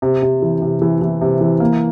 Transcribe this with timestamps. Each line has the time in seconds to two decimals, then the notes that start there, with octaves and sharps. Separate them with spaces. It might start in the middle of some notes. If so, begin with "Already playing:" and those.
0.02 C3
0.22 C3
0.42 E3
0.62 C3
0.82 E3
1.01 E3
1.21 C3
1.41 E3
1.60 A#3